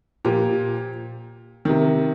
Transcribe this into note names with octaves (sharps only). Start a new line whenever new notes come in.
A#2 F3 G4
C3 D#3